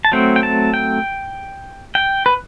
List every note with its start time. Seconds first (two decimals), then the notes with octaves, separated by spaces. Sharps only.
0.05 A5
0.12 F#3 A3 C4 G5
0.36 G5
0.43 A5
0.74 G5
1.95 G5
2.26 B4